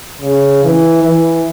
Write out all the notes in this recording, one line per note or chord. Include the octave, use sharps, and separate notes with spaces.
C#3
E3
E3